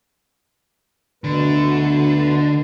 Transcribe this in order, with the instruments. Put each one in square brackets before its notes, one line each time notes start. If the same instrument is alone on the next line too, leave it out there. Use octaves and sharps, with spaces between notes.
[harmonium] D2 B2 B4 [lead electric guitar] D3